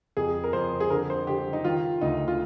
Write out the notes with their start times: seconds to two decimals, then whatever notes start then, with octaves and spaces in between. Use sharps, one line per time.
0.17 F2 G#4
0.44 A#4
0.53 F2 C5
0.80 G#4
0.90 D3 A#4
1.10 C5
1.27 D3 G4
1.53 D#4
1.64 D#3 F4
2.01 D2 D#4
2.28 F4